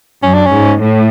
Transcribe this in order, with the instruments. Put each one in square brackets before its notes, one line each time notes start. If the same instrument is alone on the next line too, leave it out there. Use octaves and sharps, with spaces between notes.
[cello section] F#2 [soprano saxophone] C#4
[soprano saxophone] D4
C#4
[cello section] G#2
A2